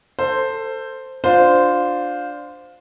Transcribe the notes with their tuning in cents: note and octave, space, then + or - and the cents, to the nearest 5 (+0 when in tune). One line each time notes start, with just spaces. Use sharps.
A4 +25 C5 +0
D4 +0 F4 +20 C5 -10